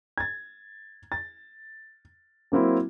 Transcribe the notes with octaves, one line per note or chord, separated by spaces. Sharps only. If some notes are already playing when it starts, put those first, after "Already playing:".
G#6 A6
A6
F#3 A#3 C4 E4